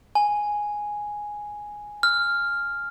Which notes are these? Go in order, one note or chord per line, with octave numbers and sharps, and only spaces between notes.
G#5
F6